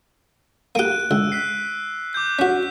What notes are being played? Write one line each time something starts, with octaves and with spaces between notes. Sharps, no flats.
A#3 G4 F#6 D7 D#7
C#2 E6
F#6 B6 C7
D6 F#6 G6
C#4 F#4 B6